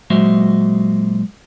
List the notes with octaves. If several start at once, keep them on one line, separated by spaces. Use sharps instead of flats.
A#2 F#3 G#3 F#4 C5 E5